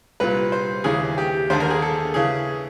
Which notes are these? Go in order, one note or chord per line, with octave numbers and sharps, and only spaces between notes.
C2 A#2 B4
C5
D#2 C#3 E3 G#4
G4
D#2 D3 C5
A#4
G#4
A4
C#3 E3 G#4